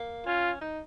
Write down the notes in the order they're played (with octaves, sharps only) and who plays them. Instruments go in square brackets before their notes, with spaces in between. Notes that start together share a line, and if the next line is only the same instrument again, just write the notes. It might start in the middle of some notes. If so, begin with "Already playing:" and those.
Already playing: [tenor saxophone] A#3
[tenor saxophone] C#4 [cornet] F4
[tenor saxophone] D#4